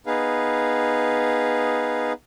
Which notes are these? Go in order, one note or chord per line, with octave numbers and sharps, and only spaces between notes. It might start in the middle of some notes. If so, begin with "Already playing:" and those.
B3 D#4 G#4 B4 F5